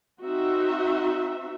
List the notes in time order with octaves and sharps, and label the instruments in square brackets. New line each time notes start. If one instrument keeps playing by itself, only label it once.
[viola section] C4 D#4 F#4 E5